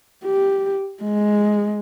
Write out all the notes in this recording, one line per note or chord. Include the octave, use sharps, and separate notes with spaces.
G4
G#3